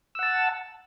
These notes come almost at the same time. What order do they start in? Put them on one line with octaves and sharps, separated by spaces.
E6 F#5 A5